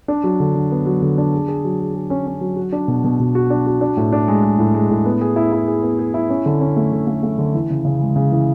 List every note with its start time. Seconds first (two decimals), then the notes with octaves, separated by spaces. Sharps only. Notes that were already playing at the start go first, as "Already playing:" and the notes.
0.08 D4
0.24 F#3
0.40 D3
0.55 D3
0.71 B3
0.86 F#3
1.02 D3
1.18 D4
1.33 G#4
1.48 G#4
1.65 F#3
1.80 G#4
1.95 G#4
2.10 C#4
2.27 C#4
2.41 F#3
2.57 F#4
2.72 D4
2.88 B2
3.04 B2
3.20 B2
3.35 F#4
3.50 D4
3.66 F#4
3.81 D4
3.97 A2
4.12 D4
4.28 G#3
4.43 G#3
4.59 A2
4.75 G#3
4.90 A2
5.05 B3
5.21 G#4
5.36 E4
5.52 E4
5.68 G#4
5.83 B3
5.99 G#4
6.14 E4
6.29 C#4
6.46 D3
6.60 C#4
6.77 A3
6.92 D3
7.07 A3
7.23 A3
7.38 D3
7.54 E3
7.70 C#3
7.85 C#3
8.01 G#3
8.16 C#3
8.31 E3